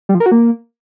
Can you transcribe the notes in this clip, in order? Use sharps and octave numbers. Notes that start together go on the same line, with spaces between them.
G3
F3
A#4
F#4
A#3